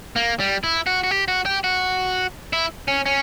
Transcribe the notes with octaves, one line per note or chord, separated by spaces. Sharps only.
A#3
G3
E4
F#4
F#4
G4
F#4
G4
F#4
E4
C#4
C#4